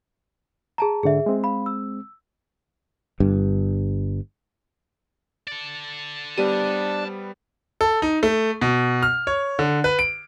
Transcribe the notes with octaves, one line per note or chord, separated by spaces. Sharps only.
G#4 A5 A#5
G#2 D3 G#4 E5
G#3 C4
F5 B5
E6
G1 G2
A4 D5
G3 B3 D4 G4 C5 D#7
A4
D#4
A3
B2
F6
C#5
D3
B4
D7